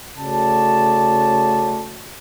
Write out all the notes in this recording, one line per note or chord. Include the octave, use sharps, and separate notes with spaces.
C#3 A3 F#4 C#5 D5 A5